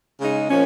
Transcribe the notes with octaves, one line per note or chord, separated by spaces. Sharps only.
C#3 G#3 D#4
A#2 F3 C#4